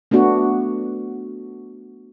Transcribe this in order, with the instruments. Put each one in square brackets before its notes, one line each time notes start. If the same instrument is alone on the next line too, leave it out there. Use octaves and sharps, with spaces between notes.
[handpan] A3 B3 D4 F#4